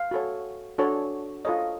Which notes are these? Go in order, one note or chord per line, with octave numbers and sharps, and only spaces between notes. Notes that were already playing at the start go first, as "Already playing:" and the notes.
Already playing: F5
F#4 A4 C#5
D4 F#4 A4 C#5
F4 A4 C#5 D#5